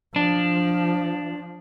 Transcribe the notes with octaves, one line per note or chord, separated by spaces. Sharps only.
F3 D4